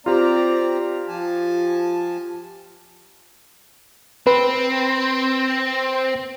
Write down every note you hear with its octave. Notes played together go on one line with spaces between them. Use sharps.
C4 F4 G4 D5 A#5
F3 G#5 A5
C4 B4